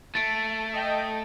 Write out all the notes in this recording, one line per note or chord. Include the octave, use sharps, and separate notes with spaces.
A3 A6 D7
D#5 G5